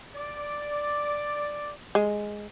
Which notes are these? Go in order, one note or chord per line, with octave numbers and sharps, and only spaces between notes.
D5
G#3